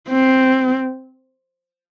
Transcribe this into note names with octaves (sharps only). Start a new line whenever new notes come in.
C4